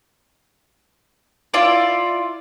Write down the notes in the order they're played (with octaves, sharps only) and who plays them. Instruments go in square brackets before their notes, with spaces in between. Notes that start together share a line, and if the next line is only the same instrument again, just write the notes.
[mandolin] E4 F4 D5